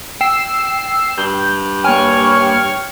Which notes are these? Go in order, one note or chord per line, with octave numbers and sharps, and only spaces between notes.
G5 E6 C7 E7
G2 G6
A#3 C#5 G5 G#5 C#6 F6